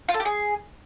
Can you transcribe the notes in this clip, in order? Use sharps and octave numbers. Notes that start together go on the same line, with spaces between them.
F4
A4
G4
G#4